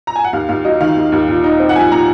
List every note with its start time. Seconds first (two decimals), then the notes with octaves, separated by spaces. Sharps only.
0.07 A#5
0.16 G#5
0.24 F#5
0.33 D#2 F5
0.49 D#2 F5
0.65 F#3 D#5
0.80 D#3 F5
0.97 D#2
1.12 D#2
1.28 A#2
1.44 D#4
1.59 C4
1.69 F#5
1.75 F3 G#5
1.91 A#2 A#5